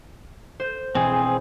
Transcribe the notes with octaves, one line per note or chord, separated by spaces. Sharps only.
C5
E1 C4 G#4 G#5